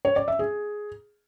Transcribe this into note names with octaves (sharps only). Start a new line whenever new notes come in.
C#5
D5
E5
G#4